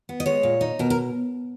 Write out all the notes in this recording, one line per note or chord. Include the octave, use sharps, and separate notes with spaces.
B3
D#5
G#3 C#5
A#2
D#4
B2 A#4
A#4